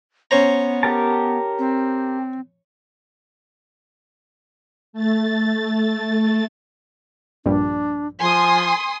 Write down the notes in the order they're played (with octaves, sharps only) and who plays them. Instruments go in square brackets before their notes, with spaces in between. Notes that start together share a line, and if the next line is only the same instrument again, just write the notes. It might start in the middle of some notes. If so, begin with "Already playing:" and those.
[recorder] B3 [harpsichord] C#4 C5 A#5
[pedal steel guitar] G4 A#4 A5
[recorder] C4
[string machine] A3 A6
[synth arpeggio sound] A#1 G2 G3 [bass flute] D4
[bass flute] F3 [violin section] G#5 C6 D#6